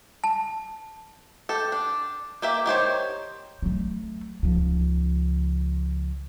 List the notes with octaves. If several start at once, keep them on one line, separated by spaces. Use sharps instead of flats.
A5
G4 A4
D4
A#3 G4 E5
D#3 G4 C5 C#5
F#3 A3
C#2 F3